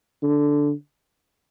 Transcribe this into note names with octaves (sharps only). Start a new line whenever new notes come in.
D3